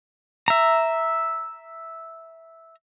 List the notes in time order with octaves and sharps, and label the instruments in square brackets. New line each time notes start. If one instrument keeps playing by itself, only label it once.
[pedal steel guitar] E5 A#5